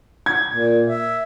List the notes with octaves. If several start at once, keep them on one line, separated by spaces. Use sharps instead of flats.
G#6
A#2
E5